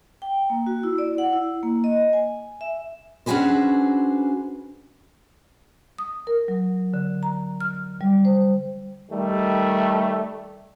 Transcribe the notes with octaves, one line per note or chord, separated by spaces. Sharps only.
G5
A#3
F#4
E4
D5
F#5
E4
A#3
D#5
G#5
E5
C#4 D4 F#4 G#4 B4 C5
D#6
A#4
F#3
D3
A#5
F6
G3
C5
D#3 G3 A3